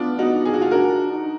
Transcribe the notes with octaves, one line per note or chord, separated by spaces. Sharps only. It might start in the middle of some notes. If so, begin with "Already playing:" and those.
Already playing: B3 D4 F4
D#4 F#4
G#4
F#4
F4 G#4
D4 F#4 A#4
D#4